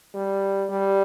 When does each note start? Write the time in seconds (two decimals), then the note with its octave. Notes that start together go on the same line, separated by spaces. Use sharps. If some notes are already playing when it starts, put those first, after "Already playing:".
0.15 G3
0.70 G3